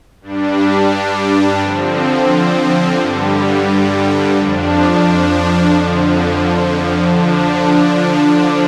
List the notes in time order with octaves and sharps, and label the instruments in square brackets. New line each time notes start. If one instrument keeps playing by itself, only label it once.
[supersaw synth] G2 G3 D4
D3 F3 C4
G2 D3 G3
F2 F3 D4
F2 D3 F3
D3 F3 D4